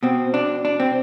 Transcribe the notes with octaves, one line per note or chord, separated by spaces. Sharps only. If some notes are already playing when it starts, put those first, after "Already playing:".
B2 C4
D4
D4
C4